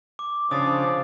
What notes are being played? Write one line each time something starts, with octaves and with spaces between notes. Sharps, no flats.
D6
C#3 F3 D4 D#6 A6 C7